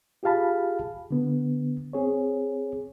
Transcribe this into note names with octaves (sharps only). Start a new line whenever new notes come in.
F4 G4 G#4 F5 A5 B5
D3 B3
C4 G#4 C#5